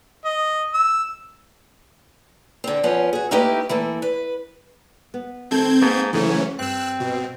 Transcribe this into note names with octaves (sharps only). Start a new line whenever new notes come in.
D#5
E6
D3 C4
F3 B3 C#4
F#4 G#4
A3 A#3 D#4 E4 G4 B4
E3 A3 A#3
B4
B3
D#3 A3 C4 A4 G6 G#6
G#2 A#3 B3 A5
D2 G#2 C#3 E3 F#3 A3 C#4
G2 C4 E6 F#6
B2